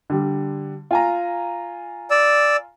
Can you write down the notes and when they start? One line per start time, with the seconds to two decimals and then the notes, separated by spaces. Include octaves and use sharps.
0.10 D3 G3
0.91 F4 G#5 A#5
2.11 D5 E6